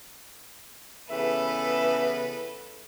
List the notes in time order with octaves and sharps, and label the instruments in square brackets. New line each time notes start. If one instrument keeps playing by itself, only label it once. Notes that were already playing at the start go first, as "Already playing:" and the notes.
[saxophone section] C#3 E3 B3 [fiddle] A4 B4 [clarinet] E5